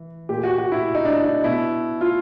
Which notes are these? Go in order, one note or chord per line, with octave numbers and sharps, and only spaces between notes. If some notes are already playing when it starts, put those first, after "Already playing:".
Already playing: E3
A#2 G4
F#4
F#4
E4
D#4
D4
D#4
B2 E4
F4